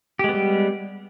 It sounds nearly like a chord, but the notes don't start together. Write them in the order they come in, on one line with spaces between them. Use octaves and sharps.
G4 G#3 B3 G3